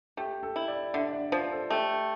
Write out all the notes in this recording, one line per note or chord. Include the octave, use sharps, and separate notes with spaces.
A3 G4
A4
E4
D5
D3 E5
D5
F3 C5
A4
A3 G4